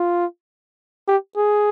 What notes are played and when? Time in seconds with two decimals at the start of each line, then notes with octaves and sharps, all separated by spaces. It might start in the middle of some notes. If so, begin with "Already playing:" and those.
Already playing: F4
1.08 G4
1.37 G#4